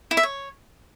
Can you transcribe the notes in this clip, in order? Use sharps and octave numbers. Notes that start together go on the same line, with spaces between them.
E4
E5
C#5